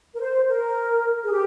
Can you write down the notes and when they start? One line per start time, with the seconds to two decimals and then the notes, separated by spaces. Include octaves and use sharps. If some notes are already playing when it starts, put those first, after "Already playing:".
0.15 A#4
0.20 C5
0.48 A#4
1.24 G#4
1.31 G4